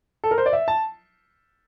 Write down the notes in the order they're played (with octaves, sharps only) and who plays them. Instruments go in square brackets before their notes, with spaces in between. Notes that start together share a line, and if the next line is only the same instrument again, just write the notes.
[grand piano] A4
A#4
C5
D5
E5
A5